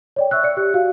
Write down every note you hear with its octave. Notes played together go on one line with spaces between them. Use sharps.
C#5 D5 G5
E5 C#6 E6 F#6
D5 C#7
G4 F#6
F#4 F5